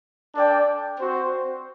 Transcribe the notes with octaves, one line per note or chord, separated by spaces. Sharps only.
D4 A4 D5 G5
C4 F#4 C5